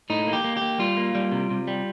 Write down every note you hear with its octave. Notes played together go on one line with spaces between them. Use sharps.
A2 D#4
A#3
G4
A#3
A#3 G4
G3 F4
A#3
G3
C3
C3
G3